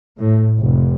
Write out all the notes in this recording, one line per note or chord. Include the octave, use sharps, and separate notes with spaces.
A2
F1